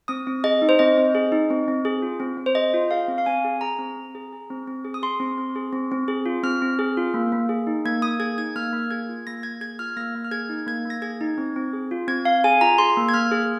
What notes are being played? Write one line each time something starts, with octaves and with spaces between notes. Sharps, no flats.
C4 D#6
C4
G#4 D#5
D#4
C5
C4 D#5
C4
G#4
D#4
C4
C4
G#4
F4
C4
C4
C5
G#4 D#5
F4
G#4 F5
C4
F5
C4 G#5
G#4
G#4 A#5
C4
C4
G#4
G#4
C4
C4
G#4
D#6
G#4 C6
C4
C4
G#4
C4
C4
G#4
F4
C4 F6
C4
G#4
F4
A#3
A#3
G#4
D#4
A#3 G#6
A#3 D#6
G#4 G#6
D#4 G#6
A#3 F6
A#3
G#4 G#6
F4
A#3 A#6
A#3 G#6
G#4 G#6
F4 F6
A#3 A#6
A#3
F6
G#4 G#6
D#4
A#3 G#6
A#3 A#6
G#4 G#6
D#4
C4
C4
G#4
F4
C4 G#6
C4 F5
G#4 G#5
F4 A#5
G#4 C6
A#3
G#6
A#3 F6
G#4